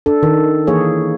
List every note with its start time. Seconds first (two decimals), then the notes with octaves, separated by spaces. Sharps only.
0.06 D4 A4
0.23 D#3
0.67 E3 A#3 G#4 C#5